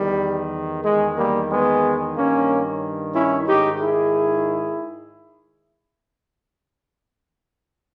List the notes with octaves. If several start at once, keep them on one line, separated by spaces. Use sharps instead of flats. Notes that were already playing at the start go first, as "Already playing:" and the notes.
Already playing: E2 D#3 G3
E2 D#3 G#3
G3 A#3
G#3 B3
G2 D#3 A#3 C#4
C#4 E4
G#2 D#3 D#4 G4
E4 G#4